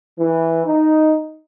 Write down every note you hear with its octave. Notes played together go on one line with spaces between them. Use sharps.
E3
D#4